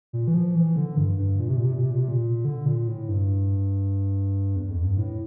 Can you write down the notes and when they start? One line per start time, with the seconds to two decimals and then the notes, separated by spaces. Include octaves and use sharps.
0.13 A#2
0.28 E3
0.34 F3
0.55 E3
0.76 D3
0.97 G2
1.19 G2
1.40 A#2
1.48 C3
1.57 A#2
1.65 C3
1.73 A#2
1.83 C3
1.91 A#2
2.00 C3
2.08 A#2
2.45 D3
2.66 A#2
2.88 A2
3.09 G2
4.56 E2
4.70 F2
4.84 G2
4.97 A2